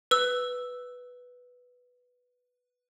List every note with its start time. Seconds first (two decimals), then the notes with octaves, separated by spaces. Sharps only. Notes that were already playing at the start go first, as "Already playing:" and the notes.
0.11 B4 E6